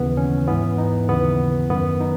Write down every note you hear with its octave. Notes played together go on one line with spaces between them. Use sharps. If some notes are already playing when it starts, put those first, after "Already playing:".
Already playing: D#2 C#3 E3 B3
C#4
G#2 E3 B3
D#4
D#2 C#3 E3 B3
F#2 D#3 B3
D#4